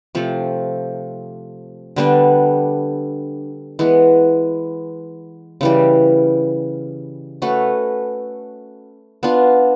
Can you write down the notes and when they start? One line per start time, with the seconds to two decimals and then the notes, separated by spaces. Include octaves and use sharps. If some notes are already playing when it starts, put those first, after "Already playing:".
0.15 C3 F3 A3
1.96 D3 G3 B3 D4
3.79 E3 G#3 B3
5.61 C#3 E3 G3
7.42 A3 C#4 F#4 B4
9.23 B3 D4 F4